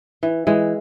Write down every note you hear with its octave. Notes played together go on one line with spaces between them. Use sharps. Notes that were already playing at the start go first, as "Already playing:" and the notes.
E3
E3 G#3